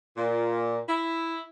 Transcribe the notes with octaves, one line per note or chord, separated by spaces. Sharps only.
A#2
E4